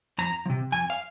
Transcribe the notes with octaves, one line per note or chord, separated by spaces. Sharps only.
F2 A#5
F3
C3
F2 G#5
F5